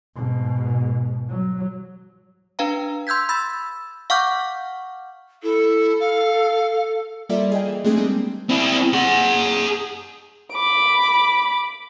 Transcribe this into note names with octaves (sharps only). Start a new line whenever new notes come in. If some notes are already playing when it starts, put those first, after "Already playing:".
G#2 B2
F#3
D4 B4 F5 A#5
C6 E6 G6 G#6 B6
B5 E6 A6
F5 F#5 C#6 D6 F6 G6
E4 A4
F5
G3 A#3 F4 A4 D5 E5
G#4 D#5 F5 G5
E3
G#3 A3 C4 D4 G#4
G3 A#3 C4 D4 D#4
C4 E4
G#4 F#5
B5 D6